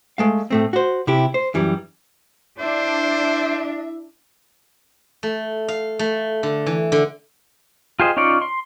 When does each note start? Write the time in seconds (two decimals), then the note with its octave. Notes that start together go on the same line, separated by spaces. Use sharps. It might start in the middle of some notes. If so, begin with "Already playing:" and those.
0.18 G#3 A3 F5
0.51 A2 A3 C4
0.73 F#4 C5
1.07 C3 E4 G4
1.34 C5
1.54 F#2 E3 G3
2.60 D4 E4 C5 E5
5.23 A3
5.68 F5
5.99 A3
6.43 D3
6.66 E3
6.92 D3
8.00 F4 G4 G#4 C5 D#5
8.17 C#4 D#4 F4 C#5 D5
8.42 C6